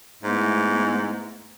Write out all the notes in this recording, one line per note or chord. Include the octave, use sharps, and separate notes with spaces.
G#2 A3 B3 E4